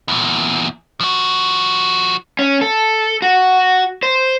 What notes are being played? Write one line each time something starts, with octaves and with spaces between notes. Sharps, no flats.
E2 A#2
F3 F#4
C#4
A4
F#4
C5